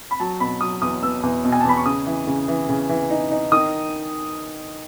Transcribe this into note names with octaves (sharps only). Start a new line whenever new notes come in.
B5
F#3 A5
B2 B5
F#3 D#6
E2 D#6
B3 E6
E2
B2
G#5
A5
E2 B5
C#6
C#3 D#6
E3
C#3
E3
C#3
E3
D#4
D#4
D#3 D#6